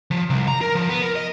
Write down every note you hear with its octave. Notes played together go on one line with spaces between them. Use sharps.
F3
C2
A#5
A#4
F3
B3
A#4
D#5